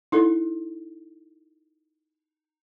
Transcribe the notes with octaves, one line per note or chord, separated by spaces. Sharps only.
D#4 E4 A4